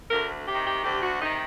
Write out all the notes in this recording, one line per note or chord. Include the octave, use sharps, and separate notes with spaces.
D2 A#4
C3 D#3 G4
G4
D2 G4
F#4
C3 D#3 D#4